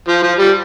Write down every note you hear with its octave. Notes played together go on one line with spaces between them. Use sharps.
F3
F3
G3